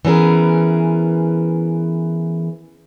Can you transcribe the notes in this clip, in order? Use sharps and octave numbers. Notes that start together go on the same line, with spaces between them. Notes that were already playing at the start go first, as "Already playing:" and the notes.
E3 B3 C#4 G#4 A#4